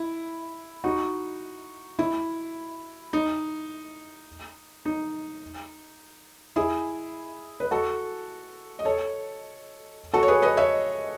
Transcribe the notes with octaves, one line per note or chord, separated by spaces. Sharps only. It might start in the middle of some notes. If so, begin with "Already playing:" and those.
Already playing: E4
D#4 F#4
E4
D#4
D#4
E4 G#4
B4
F#4 A4
D#5
A4 C#5
F#4 A4
C#5
G#4 B4
B4 D#5
C#5 E5